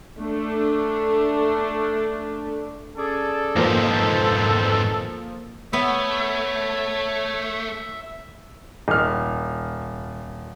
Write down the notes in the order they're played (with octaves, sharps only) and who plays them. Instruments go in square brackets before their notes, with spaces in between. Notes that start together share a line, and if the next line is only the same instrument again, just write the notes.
[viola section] A3 D4
[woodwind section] C#4 G#4 D5 [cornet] A4
[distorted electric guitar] F2 G#2 [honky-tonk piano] F3 A#3 [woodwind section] B4 C5
[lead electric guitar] A3 [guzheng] B3 [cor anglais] C#5 [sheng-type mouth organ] E5
[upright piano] D#1 F6